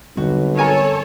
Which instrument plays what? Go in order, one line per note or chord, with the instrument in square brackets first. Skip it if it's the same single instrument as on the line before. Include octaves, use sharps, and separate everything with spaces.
[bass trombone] B1 [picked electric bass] D3 G3 C4 [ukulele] F#4
[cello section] A4 C#5 [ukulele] A#4 G#5 A#5